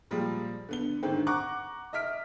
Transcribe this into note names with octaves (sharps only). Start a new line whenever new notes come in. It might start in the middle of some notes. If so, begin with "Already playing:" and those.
A#2 F3 G3 G#3
D3 B3 G7
G#2 D3 D#3 C4
F#5 A#5 C#6 D6 F#6
D#5 E5 F6 B6 D7